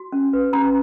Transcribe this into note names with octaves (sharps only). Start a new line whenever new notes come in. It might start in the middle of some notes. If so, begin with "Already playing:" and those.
Already playing: F#4
C#4
B4
C#4 A#5